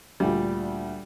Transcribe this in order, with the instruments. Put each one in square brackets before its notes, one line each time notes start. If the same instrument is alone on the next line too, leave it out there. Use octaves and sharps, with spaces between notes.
[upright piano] D2 A#2 [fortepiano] G3